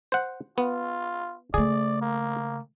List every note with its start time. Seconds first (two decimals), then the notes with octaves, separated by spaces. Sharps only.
0.12 C5 F#5
0.58 B3 F4
1.54 C#3 A3 G#4 D5
2.02 A#3